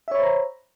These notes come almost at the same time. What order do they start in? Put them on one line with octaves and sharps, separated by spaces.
E5 C#5 B5 C5 A#5